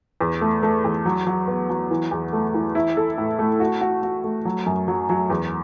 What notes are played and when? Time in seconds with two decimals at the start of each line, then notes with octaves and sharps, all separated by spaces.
0.21 E2
0.41 A3
0.63 A3
0.84 E2
1.05 F#3
1.27 F#3
1.48 B3
1.70 F#3
1.91 E3
2.11 E2
2.33 A3
2.54 E3
2.75 E4
2.97 A4
3.18 A2
3.39 A3
3.60 F#4
3.81 F#4
4.03 F#4
4.24 A3
4.45 F#3
4.66 F#2
4.88 F#3
5.09 F#3
5.30 E2